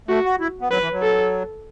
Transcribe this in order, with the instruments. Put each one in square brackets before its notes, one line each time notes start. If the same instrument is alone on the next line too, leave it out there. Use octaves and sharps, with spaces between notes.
[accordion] A3 [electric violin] F#4
[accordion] F#4
E4
B3
[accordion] F#3 [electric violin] B4
[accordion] E3
F#3
[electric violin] A4